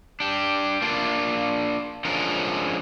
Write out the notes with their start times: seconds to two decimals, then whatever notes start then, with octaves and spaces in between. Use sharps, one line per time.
0.20 D4 G4
0.82 A#3 D4 F4
2.05 D3 F3 G#3 C#4 D4 A#4